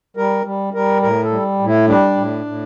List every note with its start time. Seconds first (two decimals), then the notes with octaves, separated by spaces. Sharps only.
0.17 G3 A#4
0.45 G3
0.74 G3 A#4
1.02 A2 A#4
1.24 A4
1.31 G3
1.59 A2
1.66 E4
1.88 G3 D4
2.17 A2
2.45 A2